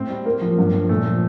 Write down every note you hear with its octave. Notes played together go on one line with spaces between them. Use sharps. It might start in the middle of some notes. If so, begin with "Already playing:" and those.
Already playing: A2 C4
G3
A2 A#3
F3
G2
F3
A#2 A3
F3